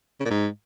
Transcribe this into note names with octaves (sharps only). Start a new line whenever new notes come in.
C#3
A#2
G#2